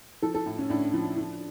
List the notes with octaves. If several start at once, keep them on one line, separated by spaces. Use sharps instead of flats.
F3 A4
A4
A2
C#4
A2 D4
F3
F3